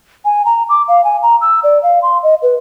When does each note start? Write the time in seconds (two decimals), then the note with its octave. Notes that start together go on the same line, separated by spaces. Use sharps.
0.25 G#5
0.45 A#5
0.69 D6
0.88 F5
1.04 G#5
1.22 A#5
1.41 E6
1.64 D5
1.83 F5
2.02 C6
2.23 D#5
2.42 B4